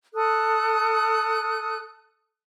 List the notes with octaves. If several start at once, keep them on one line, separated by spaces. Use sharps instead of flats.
A4 D#6 F#6